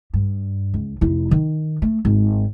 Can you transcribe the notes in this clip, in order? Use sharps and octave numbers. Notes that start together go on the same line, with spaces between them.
G2
C#2
F1 E4
D#3
A3
G#1